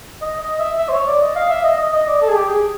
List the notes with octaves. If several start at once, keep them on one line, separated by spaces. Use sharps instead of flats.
D#5
D#5
E5
E5
C5
C#5
D5
D#5
F5
E5
D#5
D#5
D#5
D5
A4
G#4
G4
G#4